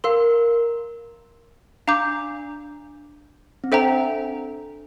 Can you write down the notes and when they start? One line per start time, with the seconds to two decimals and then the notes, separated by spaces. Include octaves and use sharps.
0.04 A#4 F5 C6 E6
1.88 D4 F5 A#5 D6 G6
3.64 C4
3.72 D4 A4 C5 E5 G5 A#5